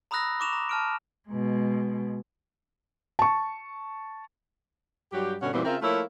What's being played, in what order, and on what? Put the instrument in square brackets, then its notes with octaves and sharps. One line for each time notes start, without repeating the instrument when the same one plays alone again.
[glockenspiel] A#5 B5 D#6 E6 F#6 A#6
C#6 D6 E7 F7
A#5
A5 F6 D7
[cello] B2 G#3
[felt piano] A5 C#6
[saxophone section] G2 F#3 G3 G4
G2 B2 D3 C#4 F#4 F#5
F#2 A#2 E3 G3 B3 C4
C#3 C4 F4 A#4 E5
F3 A3 A#3 E4 F4 C#5